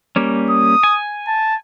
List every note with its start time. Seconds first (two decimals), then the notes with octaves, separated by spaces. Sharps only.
0.16 G3 A#3 C#4
0.50 D#6
0.83 G#5
1.28 A5